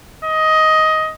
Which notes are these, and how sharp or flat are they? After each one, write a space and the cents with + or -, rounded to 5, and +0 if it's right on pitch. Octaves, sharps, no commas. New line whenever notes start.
D#5 +15